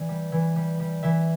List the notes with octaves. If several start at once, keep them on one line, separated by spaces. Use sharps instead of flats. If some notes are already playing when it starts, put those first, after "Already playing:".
Already playing: E3 D5
G3
E3
G3
G3
E3 E5